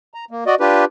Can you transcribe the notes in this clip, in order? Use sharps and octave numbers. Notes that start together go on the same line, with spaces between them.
A#5
A#3
F#4 D5 D#5
D4 F4 G4 B4